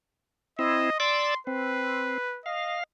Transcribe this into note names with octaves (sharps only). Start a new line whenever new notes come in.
C4 E4 D#5
D5 C6 D6 E6
C4 B4
D#5 F5